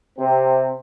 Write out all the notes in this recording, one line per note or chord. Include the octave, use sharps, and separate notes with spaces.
C3 C4